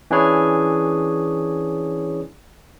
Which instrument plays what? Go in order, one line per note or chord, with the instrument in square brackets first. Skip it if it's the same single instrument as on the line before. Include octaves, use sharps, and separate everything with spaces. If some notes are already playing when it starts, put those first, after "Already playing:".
[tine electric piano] E3 C#4 D4 E4 G#4 C#5